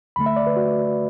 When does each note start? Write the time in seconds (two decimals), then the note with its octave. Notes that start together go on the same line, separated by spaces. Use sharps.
0.16 D2 D3 A3 B5
0.26 E5
0.36 D5
0.47 B4
0.56 F#4